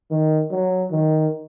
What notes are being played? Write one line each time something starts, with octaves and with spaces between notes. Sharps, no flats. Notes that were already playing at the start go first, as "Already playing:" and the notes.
D#3
F#3
D#3